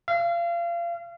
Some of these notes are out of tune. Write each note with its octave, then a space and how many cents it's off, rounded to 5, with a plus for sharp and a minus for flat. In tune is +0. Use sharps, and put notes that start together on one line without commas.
F5 -30